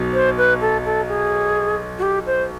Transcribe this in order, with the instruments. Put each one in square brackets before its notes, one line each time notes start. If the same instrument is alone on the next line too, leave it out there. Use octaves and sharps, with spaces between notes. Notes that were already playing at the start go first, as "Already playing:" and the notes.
Already playing: [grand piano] B1 B2 F#3
[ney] C5
B4
A4
A4
G#4
F#4
G4
C5